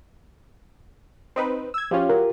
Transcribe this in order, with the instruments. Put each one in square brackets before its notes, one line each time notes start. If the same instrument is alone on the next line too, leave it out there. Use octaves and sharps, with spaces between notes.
[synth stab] C4 D#4 B4
E6 G#6
[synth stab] F3 C#4 [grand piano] F4 G4
[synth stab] F#3 [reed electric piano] A#4